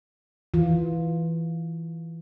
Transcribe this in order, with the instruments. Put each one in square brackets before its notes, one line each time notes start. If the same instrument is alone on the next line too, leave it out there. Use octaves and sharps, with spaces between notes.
[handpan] E3 F4